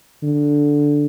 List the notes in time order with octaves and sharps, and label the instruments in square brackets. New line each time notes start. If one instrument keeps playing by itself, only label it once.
[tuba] D3